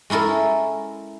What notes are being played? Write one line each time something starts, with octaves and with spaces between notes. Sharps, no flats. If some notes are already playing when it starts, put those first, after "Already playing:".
G#3 C#4 E4 A4 A#4